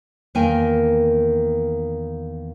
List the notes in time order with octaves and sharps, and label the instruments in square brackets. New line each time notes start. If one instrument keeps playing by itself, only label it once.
[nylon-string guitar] E2 D#3 A#3 A#4 G5 G#5